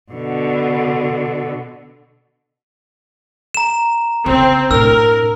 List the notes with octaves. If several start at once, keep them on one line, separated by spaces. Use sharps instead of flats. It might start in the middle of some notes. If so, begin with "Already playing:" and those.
B2 D3
A#5 E7
C#3 C4 C#4
A2 D4 A#4 E6